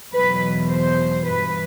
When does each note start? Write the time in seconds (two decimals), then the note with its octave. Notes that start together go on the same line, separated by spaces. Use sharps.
0.13 E2 B2 F#3 B4
0.70 C5
1.28 G2 E3 B4